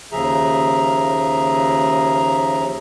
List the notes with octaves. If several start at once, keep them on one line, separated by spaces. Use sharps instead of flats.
D#2 C#3 F3 G#4 E5 A#5